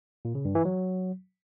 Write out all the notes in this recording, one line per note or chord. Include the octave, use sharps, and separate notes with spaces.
A#2
C#3
G2
E3
F#3